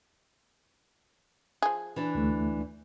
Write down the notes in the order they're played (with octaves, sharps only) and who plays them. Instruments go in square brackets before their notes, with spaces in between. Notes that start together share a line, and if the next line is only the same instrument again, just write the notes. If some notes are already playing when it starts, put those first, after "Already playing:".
[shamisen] F3 G#4
[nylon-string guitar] E3 D4
[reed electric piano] D2 A3